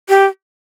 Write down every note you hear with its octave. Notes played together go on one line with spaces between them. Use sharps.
G4